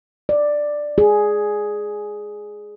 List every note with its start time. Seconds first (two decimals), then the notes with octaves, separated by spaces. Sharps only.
0.29 D5
0.98 G#4